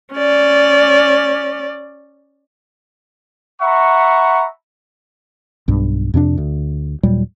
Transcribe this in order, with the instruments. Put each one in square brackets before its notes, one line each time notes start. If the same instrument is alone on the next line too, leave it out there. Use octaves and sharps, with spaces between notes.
[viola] C#4 D5
[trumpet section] E5 F#5 A#5 B5 C#6
[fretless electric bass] B1 G2
F2 C3 C#4 D4
D2
D#2 A#2 F#3 G3